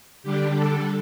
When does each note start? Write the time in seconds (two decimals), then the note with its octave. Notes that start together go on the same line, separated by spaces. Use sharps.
0.23 D3 G3 D4 G4
0.55 A4